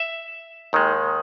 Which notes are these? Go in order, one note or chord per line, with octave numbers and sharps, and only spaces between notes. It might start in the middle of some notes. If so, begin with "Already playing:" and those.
Already playing: E5
D#2 D#3 G#3